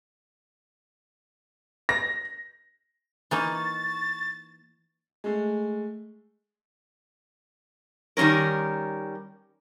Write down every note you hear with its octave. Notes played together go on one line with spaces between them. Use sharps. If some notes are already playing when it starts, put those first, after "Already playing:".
A#6
E3 A#3 D#4 C#6 A6
G#3 A3
D#3 G3 A#3 C#4 A#4